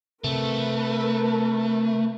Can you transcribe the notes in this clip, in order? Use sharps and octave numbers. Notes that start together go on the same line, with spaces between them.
C3 A3 A#4 B4